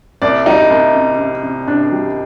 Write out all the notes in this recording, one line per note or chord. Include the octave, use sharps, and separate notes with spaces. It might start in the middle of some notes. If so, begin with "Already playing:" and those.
C2 D5
G3 D#4
C2
C3
C3
C3
C3 D4
G3